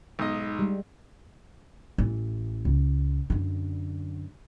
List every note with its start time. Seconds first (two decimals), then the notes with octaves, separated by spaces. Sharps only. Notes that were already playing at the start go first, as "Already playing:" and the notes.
0.19 B1 G#2 D#5
0.59 G3 G#3
1.98 A1 E3
2.65 C#2
3.30 F#2 D3